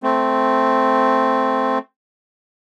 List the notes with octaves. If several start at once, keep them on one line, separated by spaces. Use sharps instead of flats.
A3 C4